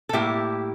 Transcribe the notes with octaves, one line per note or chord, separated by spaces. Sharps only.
A4
A2 G3 A#3 E4 G4